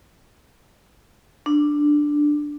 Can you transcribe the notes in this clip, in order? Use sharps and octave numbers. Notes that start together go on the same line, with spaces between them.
D4